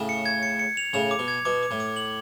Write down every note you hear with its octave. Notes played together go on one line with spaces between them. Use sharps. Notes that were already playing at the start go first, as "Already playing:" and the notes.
Already playing: A2 C#3
C#7
G#6
C#7
C#7
F7
A2 C#3 F7
D6
B2
G#6
B2 D6
D6
A2
D6
F#7